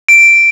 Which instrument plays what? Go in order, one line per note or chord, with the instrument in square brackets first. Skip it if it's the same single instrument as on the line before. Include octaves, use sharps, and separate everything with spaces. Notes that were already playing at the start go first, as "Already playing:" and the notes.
[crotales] D7